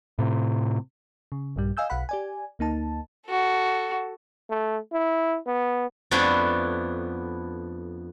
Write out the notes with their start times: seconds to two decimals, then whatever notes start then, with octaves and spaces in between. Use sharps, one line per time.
0.19 A2 C3
1.32 C#3
1.56 A#1 G2 G3
1.77 D#5 F5 G#5 E6 G6
1.90 B1 F5 F#5 B5
2.09 G4 D5 G#5
2.59 D2 A#3 D#4 A5
3.27 F#4 A4
4.49 A3
4.92 E4
5.46 B3
6.11 F2 A3 B3 D4 E4 E5